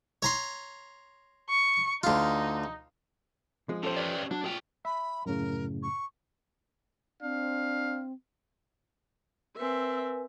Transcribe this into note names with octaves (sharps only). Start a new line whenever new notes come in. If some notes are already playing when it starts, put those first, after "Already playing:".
C#5 A#5 C6
C#6
D2 D#4 F4
F3 G#3
C#4 G4 A4 C5
B4 D5
F#3 D4
B1 F4 G#4 G5
E5 B5
F#2 A2 C#3 A#4
C#6
C4 D4 F5
C4 A#4 B4 E5 G#5